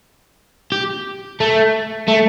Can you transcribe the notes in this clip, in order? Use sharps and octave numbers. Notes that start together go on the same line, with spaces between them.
G4
A3
A3